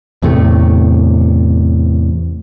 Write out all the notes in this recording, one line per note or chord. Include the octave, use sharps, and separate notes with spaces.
E2 A2 C3 A3